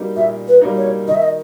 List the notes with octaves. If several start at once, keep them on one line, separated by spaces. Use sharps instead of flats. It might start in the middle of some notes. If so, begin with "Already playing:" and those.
Already playing: G3 A#3 D#4
A#2 E5
B4
G3 A#3 D#4
C#5
D#3 D#5
E5
D#5